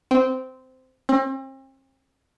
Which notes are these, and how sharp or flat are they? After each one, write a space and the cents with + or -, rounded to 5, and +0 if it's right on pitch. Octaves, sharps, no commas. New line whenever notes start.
C4 -15
C4 +40